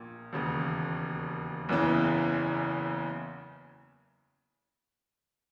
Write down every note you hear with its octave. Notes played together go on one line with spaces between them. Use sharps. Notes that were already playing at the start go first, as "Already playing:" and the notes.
Already playing: A#1 A#2
E1 D#2 C#3
F#1 E2 C#3 E3